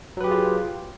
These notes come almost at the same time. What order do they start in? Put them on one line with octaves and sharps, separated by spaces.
F#3 B4 G4 G#4 F4